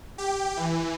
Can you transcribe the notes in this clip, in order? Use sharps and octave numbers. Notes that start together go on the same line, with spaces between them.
G4
E3